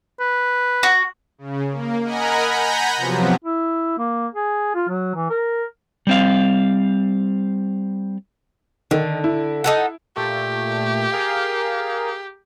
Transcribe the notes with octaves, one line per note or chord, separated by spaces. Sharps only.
B4
F#4
C#3
A#3
A#4 D#5 F#5 G#5 A#5 B5
F#5 G#5 A#5 B5 G6 A#6
C3 F3 F#3 B3
E4
A#3
G#4
F4
F#3
E3
A#4
G3 C4 F5
D3 D#3
E4
D#4 A4 F#5
A#2 A3 G4
G#4 A#4 F5